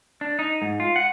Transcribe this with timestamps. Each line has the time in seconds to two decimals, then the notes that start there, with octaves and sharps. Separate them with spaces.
0.21 D4
0.39 D#4
0.62 G#2
0.80 F4
0.96 F#5